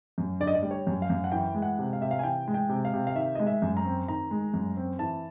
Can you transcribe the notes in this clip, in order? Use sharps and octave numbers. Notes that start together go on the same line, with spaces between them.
F#2
D3 D5
D#5
D5
G3
C#5
F#2
F5
F#2
F#5
E3 G5
G#3
F#5
C3
F5
C3 E5
F5
G#5
E3 G5
G#3
G5
C3
F5
C3
F5
D#3 E5
G#3 D#5
E5
F#2
A#5
C4
D#3 A#5
G#3
F#2
C4
E3 A5